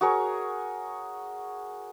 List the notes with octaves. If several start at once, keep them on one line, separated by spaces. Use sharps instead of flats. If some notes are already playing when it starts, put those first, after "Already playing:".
F#4 G#4 A#4 C#5